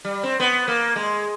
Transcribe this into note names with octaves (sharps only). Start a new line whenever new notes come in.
G3
C4
B3
A#3
G#3